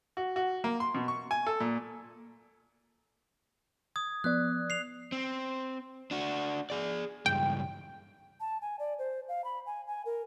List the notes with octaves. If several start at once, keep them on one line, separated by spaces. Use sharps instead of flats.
F#4
F#4
A#3
C6
B2
C#6
G#5
A4
A#2
D#6 G#6
F3 B3 D5 F#6
C7 F7
C4
D4 F#4
G#4 D5
C#2 G2 G5
A5
G#5
D5
C5
F5
B5
G#5
G#5
A#4